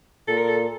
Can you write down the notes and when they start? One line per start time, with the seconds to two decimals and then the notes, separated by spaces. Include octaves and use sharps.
0.27 A#2 A4
0.38 A#4
0.48 A4